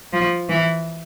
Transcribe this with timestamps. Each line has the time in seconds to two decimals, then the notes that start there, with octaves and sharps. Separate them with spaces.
0.13 F3
0.49 E3